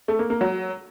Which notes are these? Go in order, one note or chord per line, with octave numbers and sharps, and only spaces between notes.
A3
A#3
A#3
F#3